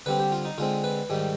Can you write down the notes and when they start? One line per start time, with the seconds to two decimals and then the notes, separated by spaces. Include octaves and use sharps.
0.06 D3 G3 C4 B4
0.19 G4
0.32 F4
0.45 D#4
0.58 D3 G#3 C4 F4
0.84 B4
1.10 G#2 D#3 G3